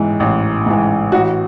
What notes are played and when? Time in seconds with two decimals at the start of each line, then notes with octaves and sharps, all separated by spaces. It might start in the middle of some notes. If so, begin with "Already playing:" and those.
Already playing: A1 G#2 E3
0.20 A1
0.66 G#2 E3
1.12 A1 F#4